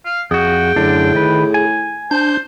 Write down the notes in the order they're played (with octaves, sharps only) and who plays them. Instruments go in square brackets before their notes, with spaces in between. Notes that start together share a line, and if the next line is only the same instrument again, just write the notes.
[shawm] F5
[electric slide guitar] F2 F#4 [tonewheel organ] G#4 [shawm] G5
[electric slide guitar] F#2 D3 D4 [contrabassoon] A2
[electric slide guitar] D#3 B4
G#5
[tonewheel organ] D4 G6 [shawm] C5